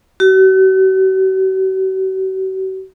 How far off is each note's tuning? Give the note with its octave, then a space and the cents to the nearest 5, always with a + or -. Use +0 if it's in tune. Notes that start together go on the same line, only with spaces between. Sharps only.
F#4 +45